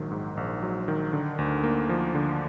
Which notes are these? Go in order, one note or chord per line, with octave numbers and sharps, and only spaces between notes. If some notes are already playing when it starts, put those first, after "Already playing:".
Already playing: A#1 G#2 D#3 F#3
G#2
A#1
F#3
D#3
D3
D2
A#3
F3
D3